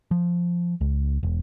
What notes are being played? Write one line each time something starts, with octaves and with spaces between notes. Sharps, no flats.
F3
C#2
E1